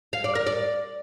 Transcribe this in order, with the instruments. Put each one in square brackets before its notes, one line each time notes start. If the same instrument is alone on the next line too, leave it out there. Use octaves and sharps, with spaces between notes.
[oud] F5
D5
A#4
D5